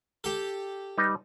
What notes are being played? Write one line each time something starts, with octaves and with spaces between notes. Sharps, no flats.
G4 A4
G3 D#4 B4